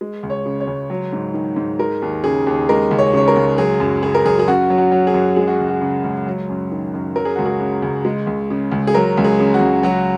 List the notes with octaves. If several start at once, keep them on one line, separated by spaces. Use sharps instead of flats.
G#3
C#2
C#5
C#3
C#5
C#2
F#3
G#2
D#3
G#2
G#3 A#4
D#2
C#3 G#4
D#2
G#3 A#4
C#2
C#5
C#3 C#5
A#4
C#2
F#3 G#4
F#2
C#3 G#4
A#4
F#2 G#4
G#4
F#2 F#4
F#3
F#4
F#3
G#4
F#2
G#3 G#4
F#4
C#2
F#4
C#3
C#2
F#3
F#2
D#3
F#2
F#3 A#4
G#4
C#2 F#4
G#4
C#3
C#2
G#3
C#2
C#3
C#2
G#4
F#3 A#4
C#2
G#4
C#3
F#4
C#2
F#3 F#4